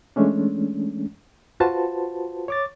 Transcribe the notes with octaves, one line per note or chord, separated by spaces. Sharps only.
E3 G#3 A3 C#4 D4
F4 F#4 B4 C5 A5
C#5 D6 A6